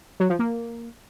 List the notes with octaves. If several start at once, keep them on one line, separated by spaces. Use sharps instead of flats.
F#3
F3
A#3